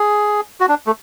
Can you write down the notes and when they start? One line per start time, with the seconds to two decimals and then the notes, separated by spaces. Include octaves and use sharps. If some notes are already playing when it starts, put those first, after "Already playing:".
Already playing: G#4
0.60 F#4
0.69 D4
0.87 A3